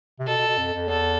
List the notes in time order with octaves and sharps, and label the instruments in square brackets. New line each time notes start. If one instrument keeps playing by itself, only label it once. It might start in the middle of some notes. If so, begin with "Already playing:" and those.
[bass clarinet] C3
[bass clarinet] B2 [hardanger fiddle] A4
[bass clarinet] B2
B2
F2
F2
[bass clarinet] E2 [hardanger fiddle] A4